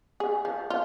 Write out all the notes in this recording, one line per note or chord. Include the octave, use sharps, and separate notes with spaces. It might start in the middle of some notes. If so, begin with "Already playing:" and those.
G#4
F3
F4